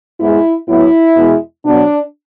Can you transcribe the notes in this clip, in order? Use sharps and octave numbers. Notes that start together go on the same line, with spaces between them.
G#2 G#3 B3 E4
A2 F#3 B3 E4
E2 B2 G#3 B3
B2 F#3 B3 D4